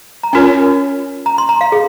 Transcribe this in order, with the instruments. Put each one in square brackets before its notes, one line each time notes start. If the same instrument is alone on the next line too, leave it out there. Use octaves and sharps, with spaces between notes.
[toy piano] A#5
[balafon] C#4 F4 A#4 C#5 [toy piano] G#5
[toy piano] A#5
C6
A#5
F5
G#4